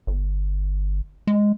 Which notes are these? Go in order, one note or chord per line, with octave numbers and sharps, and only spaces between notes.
G1
G#3